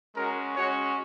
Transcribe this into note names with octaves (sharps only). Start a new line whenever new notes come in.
G#3 C#4 F#4 A#4
G#3 C#4 F#4 C#5